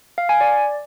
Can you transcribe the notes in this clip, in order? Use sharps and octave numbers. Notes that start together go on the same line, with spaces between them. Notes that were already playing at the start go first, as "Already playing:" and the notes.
F5
G#5
D5